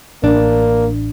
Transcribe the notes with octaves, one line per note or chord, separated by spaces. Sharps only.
A1 A#3 D4